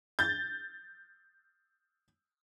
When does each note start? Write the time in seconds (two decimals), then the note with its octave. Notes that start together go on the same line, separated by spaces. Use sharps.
0.19 G6 A6